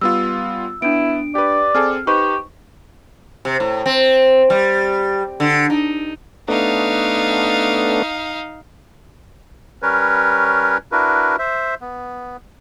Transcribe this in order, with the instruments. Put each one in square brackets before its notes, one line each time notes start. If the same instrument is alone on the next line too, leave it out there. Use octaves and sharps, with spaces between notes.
[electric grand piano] G3 B3 F4 [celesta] E6
[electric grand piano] B3 [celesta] D4 D7 [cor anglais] E4
[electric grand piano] G4 B4 [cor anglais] D5
[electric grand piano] C4 G#4 A4 [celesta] F6
[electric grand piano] D#4 B4 C5 [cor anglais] G4 [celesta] C#6
[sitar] C3
A2
C4
G3
D3
D#4
[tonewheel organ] A3 B3 D4 [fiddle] D#4 F5
[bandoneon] G3 C#4 A#4 B4 C#5
D4 E4 F#4 A#4 B4
C5 E5
B3